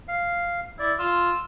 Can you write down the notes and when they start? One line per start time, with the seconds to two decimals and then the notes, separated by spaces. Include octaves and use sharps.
0.08 F5
0.79 E4 D5
0.99 F4 E6